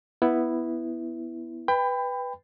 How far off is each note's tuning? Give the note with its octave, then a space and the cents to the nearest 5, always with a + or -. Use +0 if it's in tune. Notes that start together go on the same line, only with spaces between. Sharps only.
B3 +0 E4 +0
B4 +0 G5 +20 B5 +25